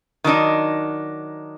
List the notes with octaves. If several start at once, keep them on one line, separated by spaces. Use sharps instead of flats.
D#3 F#3 D4 D#4